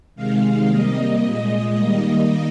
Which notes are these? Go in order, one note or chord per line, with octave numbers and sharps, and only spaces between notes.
C3 D#3 G#3 F5
C3 G3 A#3 D#5
A#2 G#3 D#5
D#3 G3 A#3